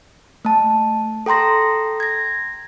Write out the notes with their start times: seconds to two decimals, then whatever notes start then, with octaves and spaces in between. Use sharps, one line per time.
0.45 A3 A5
1.26 A4 G5 A#5 C6 A#6
2.00 G#6 A#6